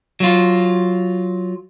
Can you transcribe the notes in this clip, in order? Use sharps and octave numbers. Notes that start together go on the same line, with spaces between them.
F#3 F4